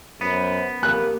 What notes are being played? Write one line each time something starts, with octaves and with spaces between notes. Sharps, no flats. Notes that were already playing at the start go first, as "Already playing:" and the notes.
F#2 B3 C5
A#3 G4 F#6